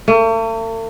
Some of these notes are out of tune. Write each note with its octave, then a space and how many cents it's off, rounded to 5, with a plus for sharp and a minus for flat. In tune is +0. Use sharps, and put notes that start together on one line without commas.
A3 +45